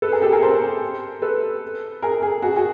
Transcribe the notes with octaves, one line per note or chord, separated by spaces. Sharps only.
A4 B4
G#4 A#4
G4 A4
G#4 A#4
A#4 C5
A4 B4
G#4 A#4
G#4 A#4
F#4 G#4
F#4 G#4